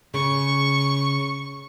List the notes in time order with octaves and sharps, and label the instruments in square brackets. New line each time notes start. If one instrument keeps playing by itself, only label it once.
[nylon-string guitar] C#3 [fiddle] C#6